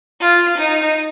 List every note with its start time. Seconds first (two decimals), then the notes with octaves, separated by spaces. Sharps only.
0.20 F4
0.58 D#4